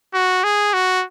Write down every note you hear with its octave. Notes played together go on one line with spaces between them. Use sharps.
F#4
G#4
F#4